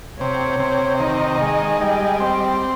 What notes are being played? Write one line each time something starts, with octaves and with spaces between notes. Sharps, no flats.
C3 C#5
C3
D#3 D#5
G#3
G3
C4